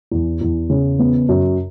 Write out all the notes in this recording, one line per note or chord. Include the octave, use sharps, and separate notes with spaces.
E2
E2
C#3
B3
F#2